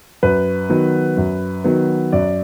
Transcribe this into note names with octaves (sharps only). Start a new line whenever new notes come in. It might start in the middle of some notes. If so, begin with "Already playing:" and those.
F#2 B4
D#3 F#3 B3
F#2
D#3 F#3 B3
F#2 D5